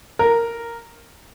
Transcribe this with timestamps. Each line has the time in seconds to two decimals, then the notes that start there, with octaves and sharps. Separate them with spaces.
0.19 A#4